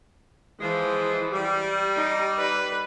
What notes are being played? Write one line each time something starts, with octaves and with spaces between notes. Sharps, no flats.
E3 F3 G#3
G3
D#4
B4